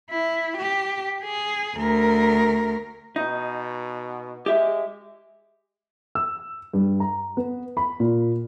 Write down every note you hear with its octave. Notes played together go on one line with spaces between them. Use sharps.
E4
G4
G#4
D2 A#4
B2 D#4
G#3 G4 E5
E6
G2
A#5
B3
B5
A#2